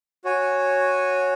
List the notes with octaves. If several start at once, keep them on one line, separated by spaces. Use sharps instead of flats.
F#4 C#5 G#5